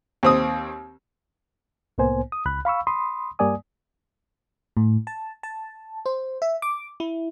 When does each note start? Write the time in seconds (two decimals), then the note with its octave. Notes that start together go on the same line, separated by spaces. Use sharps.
0.23 D#2 C4 D#6
1.98 C2 A2 A#3 B3 C5 G#5
2.32 D#6
2.46 C#2 B5 F#6
2.65 F5 B5 C#6 E6
2.87 B5 C6 D#6
3.39 G2 G3 A#3 D5 G#5 D#6
4.77 A2
5.07 A5
5.43 A5
6.06 C5
6.42 E5
6.62 D6
7.00 E4